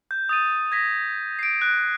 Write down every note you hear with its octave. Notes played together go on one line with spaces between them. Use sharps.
G6
D#6 A6 D#7
G#6 A#6 B6
C7 D7
F#6